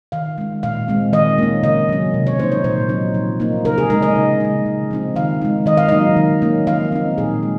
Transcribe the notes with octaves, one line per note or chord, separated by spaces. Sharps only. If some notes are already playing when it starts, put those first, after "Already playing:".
D#3 F5
G#3 C#4
A#2 F5
G#3 C4
D#3 D#5
A#3 C#4
C#3 D#5
F#3 C#4
C3
C#5
F3 A#3 D#4 C5
C#5
A#2 C5
F#3 C4 D#4
F3
A#3 D#4
C#3 A#4
G#4
G#3 D#4 A#4
D#5
C#3
G#3 D#4
C#3
F3 C4 D#4
D#3 F5
G#3 D#4
D#3 D#5
F5
F#3 A#3 D#4 D#5
D#3
A#3 C#4
F3 F5
C4 D#4
A#2 G#4
G#3